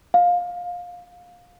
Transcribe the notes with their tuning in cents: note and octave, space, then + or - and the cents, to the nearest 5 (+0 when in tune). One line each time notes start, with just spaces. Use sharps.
F5 +20